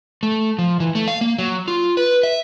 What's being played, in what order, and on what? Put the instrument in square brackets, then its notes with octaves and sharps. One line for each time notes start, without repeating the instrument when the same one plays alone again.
[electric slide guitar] A3
F3
E3
A3
F5
A#3
F#3
F4
B4
E5